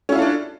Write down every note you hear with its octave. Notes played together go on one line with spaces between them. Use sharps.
C#4 D4 E4 F4 A4